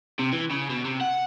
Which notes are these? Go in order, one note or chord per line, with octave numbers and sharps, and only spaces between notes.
C3
E3
C#3
B2
C3
F#5